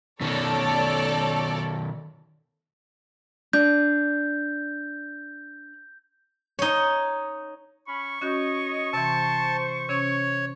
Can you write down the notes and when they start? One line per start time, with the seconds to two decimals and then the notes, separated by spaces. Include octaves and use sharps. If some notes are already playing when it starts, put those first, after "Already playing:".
0.21 B2 D#3 A4 C#5 D5
3.53 D4 G6
6.59 D#4 C#5
7.87 C#4 B5 C#6
8.21 C#4 F#4 C#5 D#5 G6
8.93 C3 E3 C5 A5
9.89 C3 C#4 C#5